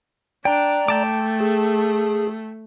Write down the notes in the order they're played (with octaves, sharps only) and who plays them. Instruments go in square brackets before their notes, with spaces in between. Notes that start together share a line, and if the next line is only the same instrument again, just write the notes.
[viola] D4 [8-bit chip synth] D5 A#5 [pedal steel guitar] G5
[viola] A3 [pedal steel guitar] G5 A5 D6
[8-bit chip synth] G#4